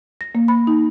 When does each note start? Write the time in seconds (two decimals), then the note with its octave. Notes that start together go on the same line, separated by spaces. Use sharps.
0.21 A#6
0.35 A#3
0.48 B5
0.67 D#4